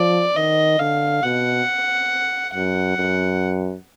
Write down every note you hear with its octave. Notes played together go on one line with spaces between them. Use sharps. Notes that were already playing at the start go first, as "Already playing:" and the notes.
Already playing: F3 D5
D#3 D#5
D3 F5
B2 F#5
F#2 F#5
F#2